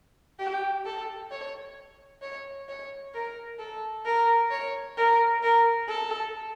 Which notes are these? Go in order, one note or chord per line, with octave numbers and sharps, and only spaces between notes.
G4
A4
C#5
C#5
C#5
A#4
A4
A#4
C#5
A#4
A#4
A4